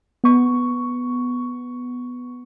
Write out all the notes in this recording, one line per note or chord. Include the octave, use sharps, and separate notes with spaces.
B3 C#6